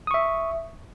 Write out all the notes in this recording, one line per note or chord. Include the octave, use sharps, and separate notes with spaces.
E5 C#6 D#6